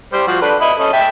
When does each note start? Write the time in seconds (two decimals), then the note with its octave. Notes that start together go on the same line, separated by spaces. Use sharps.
0.13 G3 C5
0.27 F3 F#4
0.42 D4 A4 B4
0.60 D#5 E5 B5
0.79 C#4 A4 D#5
0.93 E5 G5 A5